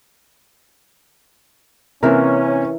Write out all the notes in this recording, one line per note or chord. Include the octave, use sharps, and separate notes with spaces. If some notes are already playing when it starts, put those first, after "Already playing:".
C3 E3 A#3 C#4 A#4